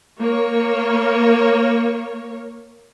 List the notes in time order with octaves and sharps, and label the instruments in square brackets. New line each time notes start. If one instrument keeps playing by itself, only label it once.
[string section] A#3 C#5